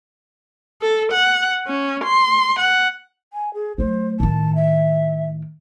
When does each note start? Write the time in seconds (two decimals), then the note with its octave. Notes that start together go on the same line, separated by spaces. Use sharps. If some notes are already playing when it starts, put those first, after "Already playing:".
0.82 A4
1.13 F#5
1.67 C#4
2.05 C6
2.60 F#5
3.33 G#5
3.54 G#4
3.78 F#3 A3 C5
4.20 A2 D#3 A5
4.55 E5